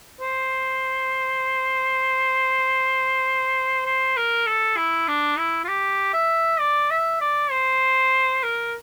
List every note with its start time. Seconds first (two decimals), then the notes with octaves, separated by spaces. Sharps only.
0.20 C5
3.86 C5
4.17 A#4
4.46 A4
4.77 E4
5.08 D4
5.38 E4
5.64 F4
5.68 G4
6.14 E5
6.60 D5
6.90 E5
7.21 D5
7.51 C5
8.43 A#4